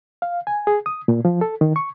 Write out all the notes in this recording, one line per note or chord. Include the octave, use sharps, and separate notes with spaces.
F5
G#5
G#4
D#6
A#2
F3
A4
D#3
C#6